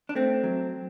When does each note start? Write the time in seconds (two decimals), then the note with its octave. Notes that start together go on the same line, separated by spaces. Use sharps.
0.09 D4
0.15 A3 C4
0.44 F#3